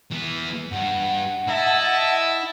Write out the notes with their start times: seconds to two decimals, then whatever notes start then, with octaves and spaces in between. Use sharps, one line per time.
0.11 E3 B3
0.72 G2 F#5
1.48 E4 D#5 E5 A5